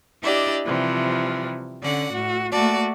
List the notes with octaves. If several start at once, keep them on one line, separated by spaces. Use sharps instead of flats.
D4 E4 G4 D5 D#5
C3 E3 F3 G3
D3 C#4 D5 F#5
A2 F#4
A3 A#3 F#4 D5 A5